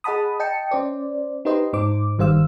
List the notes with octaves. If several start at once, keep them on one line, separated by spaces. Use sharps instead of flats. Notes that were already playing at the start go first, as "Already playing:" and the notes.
G#4 D#5 F#5 A5 B5 D#6
D#5 G5 A5 C#7
C#4 C5 D5
D#4 G4 B4 C5 D#5 C6
G#2 D#4 C5 D6
G1 D#3 G3 C5 F5 E6